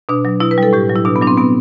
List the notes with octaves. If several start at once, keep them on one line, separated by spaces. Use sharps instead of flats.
B2 D4
F#3
B2 E4
B4
G3 A4
A2 G4
F#3
E4
B2 D4
B3
F#3 D4
C4
B2 B3